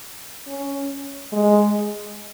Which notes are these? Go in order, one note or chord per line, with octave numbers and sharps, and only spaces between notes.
C#4
G#3